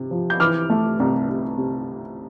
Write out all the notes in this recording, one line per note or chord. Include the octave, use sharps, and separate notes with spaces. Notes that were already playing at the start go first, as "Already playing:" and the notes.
Already playing: C3
F3
G6
E3 D6 F6
A3
C2
C2
C3